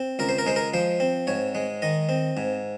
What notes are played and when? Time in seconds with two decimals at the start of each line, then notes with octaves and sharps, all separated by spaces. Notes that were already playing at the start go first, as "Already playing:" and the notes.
Already playing: C4
0.19 C#2 A#4
0.29 C5
0.38 A#4
0.46 G#3 C5
0.56 A#4
0.74 F3 C5
1.00 C4
1.27 G#2 C#5
1.55 G#3
1.82 D#3 D#5
2.09 C4
2.37 G#2